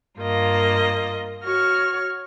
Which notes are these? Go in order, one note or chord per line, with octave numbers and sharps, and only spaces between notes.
G2 A#3 F4 D#5
F#4 C#5 C#6 F6